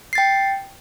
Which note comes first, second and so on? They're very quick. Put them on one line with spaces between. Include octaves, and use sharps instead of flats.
C7 A6 G5